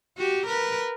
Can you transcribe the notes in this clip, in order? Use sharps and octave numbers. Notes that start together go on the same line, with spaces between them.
F#4 G4
A#4 B4